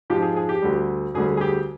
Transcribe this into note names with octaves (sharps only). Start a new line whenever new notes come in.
G#2 F3 G#3 G4
G#4
G#4
G4
D2 D3 G3
D2 D3 G3 G#4
G#4
G4